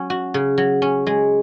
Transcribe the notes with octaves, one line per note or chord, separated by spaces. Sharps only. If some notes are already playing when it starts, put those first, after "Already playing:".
Already playing: F#3 C#4
F#4
C#3
F#3
C#4
G#3